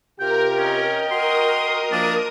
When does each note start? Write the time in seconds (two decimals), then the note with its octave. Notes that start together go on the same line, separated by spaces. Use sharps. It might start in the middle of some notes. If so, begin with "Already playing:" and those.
0.20 C3 F4 G4 A#4 G5
0.57 C#4 D#5 G5
1.11 F#4 A#4 C6 D#6
1.92 F3 A#3 D4